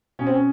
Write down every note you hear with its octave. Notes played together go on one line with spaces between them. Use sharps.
B2 C#4
C4
C#4